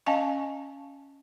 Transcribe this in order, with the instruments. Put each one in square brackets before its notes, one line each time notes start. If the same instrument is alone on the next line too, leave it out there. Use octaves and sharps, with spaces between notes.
[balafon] C#4 D#5 F5 G#5 A5 C#6